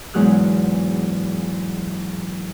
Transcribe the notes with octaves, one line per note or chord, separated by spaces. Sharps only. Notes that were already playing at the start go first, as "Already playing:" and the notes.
E2 G#2 F#3 G#4 F6 F#6